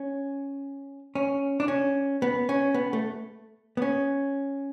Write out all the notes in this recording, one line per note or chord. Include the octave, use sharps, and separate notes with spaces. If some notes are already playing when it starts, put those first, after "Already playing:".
Already playing: C#4
C#4
D4
C#4
B3
C#4
B3
A3
B3
C#4